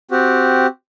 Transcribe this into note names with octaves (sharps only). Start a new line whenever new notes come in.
C4 F#4 G4